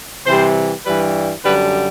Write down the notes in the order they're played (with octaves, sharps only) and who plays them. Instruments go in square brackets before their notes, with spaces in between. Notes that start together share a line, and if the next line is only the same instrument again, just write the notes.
[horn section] C3 E3 G3 C5
G2 E3 G3 B4
F#2 D3 G3 B4